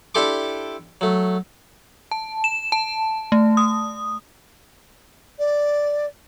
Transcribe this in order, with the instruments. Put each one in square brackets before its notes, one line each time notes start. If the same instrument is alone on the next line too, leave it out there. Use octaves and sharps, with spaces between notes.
[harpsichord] D4 E4 G4 A4 C6 D6
F#3 A3
[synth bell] A5
E7
A5
A3
D#6
[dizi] D5